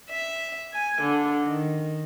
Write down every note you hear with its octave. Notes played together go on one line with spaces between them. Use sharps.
E5
G#5
D3
D#3